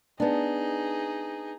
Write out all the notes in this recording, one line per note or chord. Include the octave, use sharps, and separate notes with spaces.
B3 D4 D#4 G#4